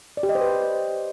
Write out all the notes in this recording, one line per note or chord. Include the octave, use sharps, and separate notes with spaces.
D5
G4
D#5
C5
B4